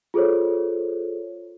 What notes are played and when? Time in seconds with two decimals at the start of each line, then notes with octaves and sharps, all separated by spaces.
0.14 F4 G#4 A4 C5 C#5